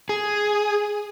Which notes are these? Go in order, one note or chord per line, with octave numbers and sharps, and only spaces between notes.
G#4